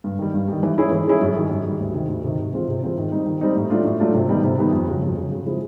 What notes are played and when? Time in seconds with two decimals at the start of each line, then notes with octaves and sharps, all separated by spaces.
0.04 G2
0.19 D#3 G3
0.34 G2
0.48 D#3 G3
0.63 E3
0.78 G#3 C#4 E4 G#4
0.92 E3
1.07 G#3 C#4 E4 G#4
1.21 F#2
1.36 D#3 G3
1.51 F#2
1.66 D#3 G3
1.80 D2
1.95 C3 D#3
2.09 D2
2.24 C3 D#3
2.39 C3
2.53 E3 G#3 C4 F4
2.68 C3
2.82 E3 G#3 C4 F4
2.97 D#3
3.11 G3 C4 D#4
3.26 D#3
3.41 G3 C4 D#4
3.56 A2
3.70 F#3 A3 D4 F4
3.85 A2
4.00 F#3 A3 D4 F4
4.14 C3
4.29 D#3 G3 B3 D#4
4.43 C3
4.58 D#3 G3 B3 D#4
4.73 F2
4.88 C#3 F#3
5.02 F2
5.17 C#3 F#3
5.31 C#3
5.46 F3 G#3 C4 E4